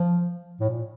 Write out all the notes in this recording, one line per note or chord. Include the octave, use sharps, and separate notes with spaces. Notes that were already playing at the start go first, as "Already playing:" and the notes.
Already playing: F3
A2
A#2